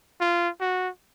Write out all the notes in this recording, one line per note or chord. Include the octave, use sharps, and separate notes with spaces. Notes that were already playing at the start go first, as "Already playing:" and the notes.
F4
F#4